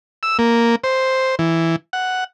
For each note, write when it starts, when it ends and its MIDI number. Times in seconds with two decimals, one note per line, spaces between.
0.23 0.37 88
0.39 0.75 58
0.84 1.35 72
1.39 1.76 52
1.93 2.24 78